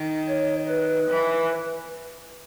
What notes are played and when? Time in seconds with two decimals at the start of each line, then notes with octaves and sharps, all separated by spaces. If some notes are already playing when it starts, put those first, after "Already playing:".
Already playing: D#3
0.28 C#5
0.69 B4
1.09 E3